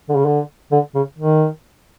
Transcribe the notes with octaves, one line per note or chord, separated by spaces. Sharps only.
D3
C#3
D3
D3
C#3
D#3